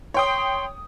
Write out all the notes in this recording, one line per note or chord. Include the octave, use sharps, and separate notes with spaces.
C#5 G5 C6 D#6